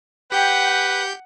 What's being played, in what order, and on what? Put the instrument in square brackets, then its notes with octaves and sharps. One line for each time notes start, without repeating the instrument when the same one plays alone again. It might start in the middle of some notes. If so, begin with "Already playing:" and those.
[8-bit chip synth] G4 G6 [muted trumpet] B4 [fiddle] F#5 [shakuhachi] G5